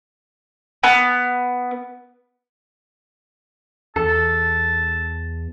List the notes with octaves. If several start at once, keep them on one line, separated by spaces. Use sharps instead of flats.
B3
E2 A4 A5